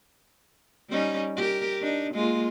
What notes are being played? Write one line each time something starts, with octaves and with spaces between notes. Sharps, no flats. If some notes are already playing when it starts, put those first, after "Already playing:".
G3 C#4 D#4
G4 A#4
D4 D#4
G#3 A#3 F4